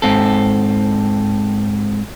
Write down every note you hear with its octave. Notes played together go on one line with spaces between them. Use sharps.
G#2 C4 A4